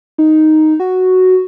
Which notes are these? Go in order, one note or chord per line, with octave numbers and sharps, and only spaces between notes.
D#4
F#4